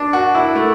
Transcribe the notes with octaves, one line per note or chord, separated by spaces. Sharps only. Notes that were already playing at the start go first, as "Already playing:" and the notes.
Already playing: D4
F#4
E4
A3